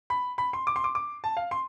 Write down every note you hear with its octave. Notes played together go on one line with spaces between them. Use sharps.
B5
B5
C6
D6
C6
D6
D6
A5
F5
C6